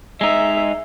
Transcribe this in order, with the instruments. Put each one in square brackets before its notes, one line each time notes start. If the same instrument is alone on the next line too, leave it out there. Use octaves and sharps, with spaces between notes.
[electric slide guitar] G#3 D#4 [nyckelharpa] E5